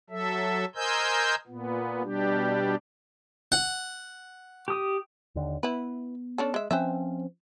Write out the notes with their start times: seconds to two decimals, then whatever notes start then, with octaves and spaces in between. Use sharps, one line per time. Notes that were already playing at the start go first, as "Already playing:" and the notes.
0.10 F#3 A4 E5
0.75 A#4 C5 D#5 G#5 E6 G6
1.47 A#2 B3
2.03 B2 G3 D4 G4
3.52 F#5
4.68 G4 D#6
5.35 D#2 D3
5.63 B3 E4 B4
6.38 C#4 D4 A4
6.54 G#3 E5
6.71 F3 C4 C#4 B4 C5 E5